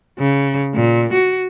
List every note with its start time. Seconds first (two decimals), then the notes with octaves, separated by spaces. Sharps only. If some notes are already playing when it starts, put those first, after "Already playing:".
0.19 C#3
0.74 A#2
1.13 F#4